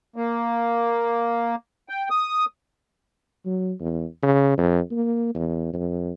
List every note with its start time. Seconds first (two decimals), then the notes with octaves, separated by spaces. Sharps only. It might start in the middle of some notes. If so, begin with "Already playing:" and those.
0.16 A#3
1.89 G5
2.10 D#6
3.45 F#3
3.80 E2
4.23 C#3
4.58 F2
4.91 A#3
5.35 E2
5.73 F2